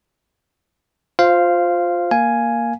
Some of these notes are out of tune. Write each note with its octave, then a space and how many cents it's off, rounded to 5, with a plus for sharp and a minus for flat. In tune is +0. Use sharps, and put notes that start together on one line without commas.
F4 +15 C5 +0 F5 -10
A#3 +0 F5 -5 G#5 +5